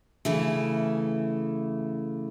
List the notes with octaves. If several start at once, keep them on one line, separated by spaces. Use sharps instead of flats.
C#3 E3 A3